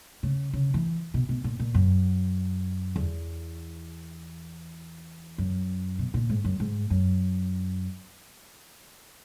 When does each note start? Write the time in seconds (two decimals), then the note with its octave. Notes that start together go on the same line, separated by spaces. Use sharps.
0.23 C#3
0.53 C#3
0.74 E3
1.14 B2
1.29 B2
1.44 A#2
1.59 A#2
1.74 F#2
2.96 E2
5.38 F#2
5.99 B2
6.14 A#2
6.30 G#2
6.44 F#2
6.60 G#2
6.90 F#2